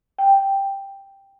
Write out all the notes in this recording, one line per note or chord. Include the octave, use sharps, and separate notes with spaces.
G5